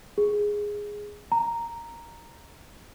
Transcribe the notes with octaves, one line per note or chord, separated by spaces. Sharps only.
G#4
A#5